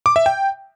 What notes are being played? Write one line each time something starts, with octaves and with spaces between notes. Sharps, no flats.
D6
E5
G5